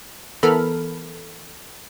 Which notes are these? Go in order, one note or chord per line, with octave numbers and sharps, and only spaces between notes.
E3 B3 A4 A#4 B5 F6